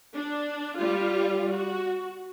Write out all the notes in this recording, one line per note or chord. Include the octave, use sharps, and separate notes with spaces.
D4
G3 F4
F#4